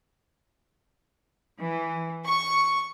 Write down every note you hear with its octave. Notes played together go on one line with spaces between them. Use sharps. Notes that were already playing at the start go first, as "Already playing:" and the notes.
E3
C#6